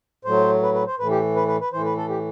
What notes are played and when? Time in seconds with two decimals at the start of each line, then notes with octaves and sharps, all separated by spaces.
0.25 A2 F#3 C5
0.62 B4
0.74 B4
0.87 C5
0.99 A2 E3 B4
1.11 G4
1.36 B4
1.48 B4
1.60 B4
1.73 A2 E3 C5
1.85 B4
1.97 A4
2.09 G4